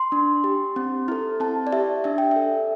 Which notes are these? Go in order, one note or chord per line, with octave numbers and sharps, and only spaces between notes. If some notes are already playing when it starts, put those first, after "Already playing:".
Already playing: C6
D4
G4
C4
E4 A4
C4 A5
D5
G4 E5
D4 E5
G5
E5
A4